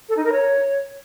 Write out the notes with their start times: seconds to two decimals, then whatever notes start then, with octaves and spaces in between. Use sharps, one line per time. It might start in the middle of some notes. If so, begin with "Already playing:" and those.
0.09 A4
0.16 D#4
0.24 A#4
0.32 C#5